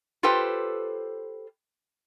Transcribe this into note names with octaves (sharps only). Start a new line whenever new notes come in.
F4 G4 A4 B4 C5 G5